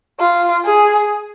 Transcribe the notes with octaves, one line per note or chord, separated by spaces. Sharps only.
F4
G#4